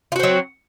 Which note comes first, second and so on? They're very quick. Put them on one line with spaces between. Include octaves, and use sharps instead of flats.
F4 F#4 C4 F#3